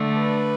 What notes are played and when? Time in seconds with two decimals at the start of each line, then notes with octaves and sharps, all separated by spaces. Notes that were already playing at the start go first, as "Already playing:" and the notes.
Already playing: D3 A3 D4
0.17 B4